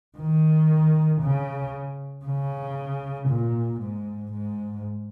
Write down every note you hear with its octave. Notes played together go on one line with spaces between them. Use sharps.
D#3
C#3
C#3
A#2
G#2
G#2